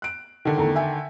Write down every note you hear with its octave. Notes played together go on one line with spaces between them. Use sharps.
F#6 D7
D3 D#3
E2 A3 A#5
E5 G5 G#5